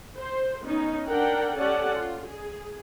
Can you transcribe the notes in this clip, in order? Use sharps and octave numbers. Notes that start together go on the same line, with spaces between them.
C5
B3 C#4 D#4
D4 A#4 F#5 G5
C#4 G4 A4 D5 F#5 A5
F4
G#4